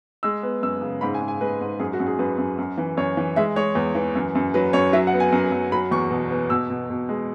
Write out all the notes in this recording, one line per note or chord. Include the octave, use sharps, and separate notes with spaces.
G#3 E6
B3
F#2 E6
C#3
G#2 B5
G#5
G#2
G#5
G#3 B4
G#2
F#2 G#4
F#4
F#2
G#4
F#2 B4
F#2
F#2
E3
F#2 C#5
E3
G#3 E5
G#3 C#5
E2
E3
F#2
F#2
F#3 B4
F#2 C#5
F#3 E5
F#5
B3
G#5
F#2
F#2
F#3 B5
E2 C#6
B2
B3
B2 E6
B2
B2
G#3